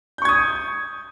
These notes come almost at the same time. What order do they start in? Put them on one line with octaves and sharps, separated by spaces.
G6 C#6 G#6 D#6